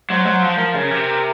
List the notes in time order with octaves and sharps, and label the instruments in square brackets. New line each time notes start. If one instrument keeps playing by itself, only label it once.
[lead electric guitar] F#3 [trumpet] C5
[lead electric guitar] F#3
F3
[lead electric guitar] F3 [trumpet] A#4
[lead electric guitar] C#3
C3